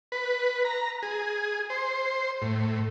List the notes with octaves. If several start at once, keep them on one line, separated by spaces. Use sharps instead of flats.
B4
A#5
G#4
C5
A2